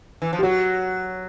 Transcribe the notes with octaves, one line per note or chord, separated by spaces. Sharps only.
E3
F3
G4
F#3 F#4